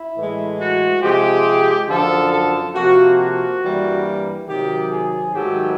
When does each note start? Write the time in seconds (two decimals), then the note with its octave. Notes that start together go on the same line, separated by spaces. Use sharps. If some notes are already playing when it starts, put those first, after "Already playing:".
Already playing: E4
0.16 A2 E3 G#3
0.59 F#4
1.02 C3 F3 G#3 G4
1.88 F#2 D3 F3 A4
2.31 A4
2.74 C3 F3 A#3 F#4
3.18 F#4
3.61 G2 E3 G3 A#3
4.47 C3 D#3 F#3 G4
4.90 G#4
5.33 G#2 D#3 F#3 A3 G4